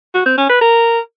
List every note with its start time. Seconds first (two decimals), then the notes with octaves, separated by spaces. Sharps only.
0.14 F#4
0.26 C4
0.38 C#4
0.49 B4
0.61 A#4